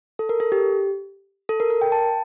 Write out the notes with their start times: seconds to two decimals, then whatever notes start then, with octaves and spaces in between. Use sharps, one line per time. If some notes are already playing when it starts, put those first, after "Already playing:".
0.19 A4
0.29 A#4
0.40 A4
0.52 G4
1.49 A4
1.60 A#4
1.70 A#4
1.82 G5
1.92 A5